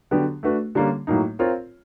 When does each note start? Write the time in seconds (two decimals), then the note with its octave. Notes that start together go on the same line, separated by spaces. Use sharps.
0.11 D3 F#3 B3 D4 G4
0.43 A3 D4 F#4 B4
0.75 D3 G3 A#3 C#4
1.07 A2 F#3 A#3 D#4
1.39 C4 F4 A#4 C#5